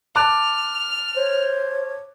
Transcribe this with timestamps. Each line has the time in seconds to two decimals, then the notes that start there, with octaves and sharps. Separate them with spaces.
0.16 A5 D6 F6 F#6
1.16 C5 C#5